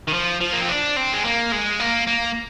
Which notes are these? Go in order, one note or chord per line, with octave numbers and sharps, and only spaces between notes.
D#3
F3
F3
A#3
C4
D4
C4
G#3
A#3
G#3
A#3
A#3